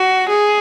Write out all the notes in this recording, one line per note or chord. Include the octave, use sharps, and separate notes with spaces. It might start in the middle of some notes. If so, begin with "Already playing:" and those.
Already playing: F#4
G#4